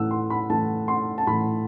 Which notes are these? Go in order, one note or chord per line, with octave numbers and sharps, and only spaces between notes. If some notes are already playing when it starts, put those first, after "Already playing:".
Already playing: A2 E3 E6 F#6
C6
B5
A2 E3 A5
C6
A5
A2 E3 B5